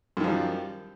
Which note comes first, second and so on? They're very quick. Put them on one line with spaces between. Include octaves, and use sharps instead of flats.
F#2 D#3 F3 G3